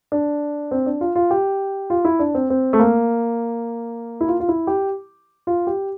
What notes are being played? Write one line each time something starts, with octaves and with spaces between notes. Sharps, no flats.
D4
C4
D4
F4
F4
G4
F4
E4
D4
C4
C4
A3
A#3
E4
F4
F4
E4
G4
F4
G4